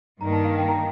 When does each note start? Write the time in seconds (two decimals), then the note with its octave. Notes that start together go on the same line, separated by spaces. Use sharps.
0.20 G2 D#3 A#3 A#5
0.32 A5
0.45 F5
0.57 G5
0.68 A#5